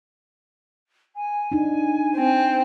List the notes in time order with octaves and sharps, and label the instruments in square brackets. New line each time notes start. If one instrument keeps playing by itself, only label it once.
[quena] G#5
[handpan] D4 D#4
[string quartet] C4